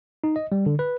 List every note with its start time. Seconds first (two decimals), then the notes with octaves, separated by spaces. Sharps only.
0.24 D#4
0.36 D#5
0.52 G3
0.66 D3
0.79 B4